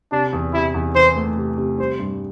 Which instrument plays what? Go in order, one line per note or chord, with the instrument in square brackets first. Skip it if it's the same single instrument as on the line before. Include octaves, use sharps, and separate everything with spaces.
[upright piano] C3 [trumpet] D4
[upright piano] E2
[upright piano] C3 [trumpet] E4
[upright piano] E2
[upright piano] E3 [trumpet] C5
[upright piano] A3
C3
C3
[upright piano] G3 [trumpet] C5
[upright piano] G2